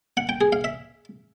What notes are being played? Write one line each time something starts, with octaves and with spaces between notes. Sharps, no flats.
F#5
G5
G#4
F5
E5